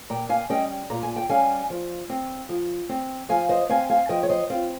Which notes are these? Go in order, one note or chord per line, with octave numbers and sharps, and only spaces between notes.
A#2 G5 A#5
F5 G#5
G3 C#4 D#5 G5
A#2 A#5
G#5
G5
G3 C#4 F5 G#5
F3
C4
F3
C4
F3 F5 G#5
C5 D#5
C4 F5 G#5
F5 G#5
F3 D#5 G5
C#5
C5 D#5
C4 F4